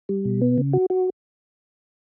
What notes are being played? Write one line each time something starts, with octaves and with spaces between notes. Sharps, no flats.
G3
B2
B3
C#3
F#4
F#4